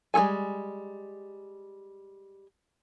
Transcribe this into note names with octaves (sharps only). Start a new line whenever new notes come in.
G3 G#3 E4 A4 G#5